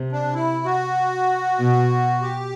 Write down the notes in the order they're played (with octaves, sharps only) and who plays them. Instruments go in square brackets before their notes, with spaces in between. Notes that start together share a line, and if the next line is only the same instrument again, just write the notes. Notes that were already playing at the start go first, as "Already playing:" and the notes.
Already playing: [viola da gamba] C3
[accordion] D4
E4
F#4
[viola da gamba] B2
[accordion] G4